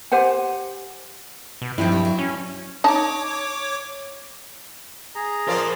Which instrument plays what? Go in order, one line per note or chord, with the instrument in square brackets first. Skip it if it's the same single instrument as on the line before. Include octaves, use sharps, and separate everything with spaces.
[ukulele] G4 C5 F#5 G#5
[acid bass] B2
[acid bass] G2 [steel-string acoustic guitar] D#3 F3 C4 [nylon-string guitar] E4
[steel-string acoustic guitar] G3
F#3
[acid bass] C#4
[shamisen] D#4 A5 A#5 [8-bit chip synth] C#5 D6
[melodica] G#4 A#5
[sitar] F3 F4 D5 [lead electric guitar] A#4 C5